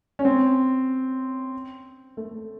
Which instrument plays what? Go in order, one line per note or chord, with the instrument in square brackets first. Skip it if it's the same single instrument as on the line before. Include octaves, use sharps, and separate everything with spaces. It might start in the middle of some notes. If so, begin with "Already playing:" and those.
[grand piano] C#4
C4
A3